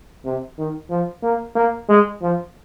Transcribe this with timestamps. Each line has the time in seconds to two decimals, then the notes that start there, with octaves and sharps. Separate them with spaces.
0.24 C3
0.58 D#3
0.90 F3
1.23 A#3
1.56 A#3
1.89 G#3
2.22 F3